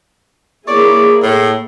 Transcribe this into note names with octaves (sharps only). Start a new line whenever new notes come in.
A#3 E4 G#4 C#5 D5
A2